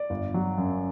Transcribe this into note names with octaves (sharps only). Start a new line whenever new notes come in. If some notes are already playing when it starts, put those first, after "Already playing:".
Already playing: D5
G1
F#3
F#2